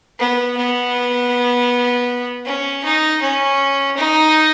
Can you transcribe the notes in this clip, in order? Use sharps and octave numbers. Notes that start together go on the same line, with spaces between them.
B3
B3
C#4
D#4
C#4
D#4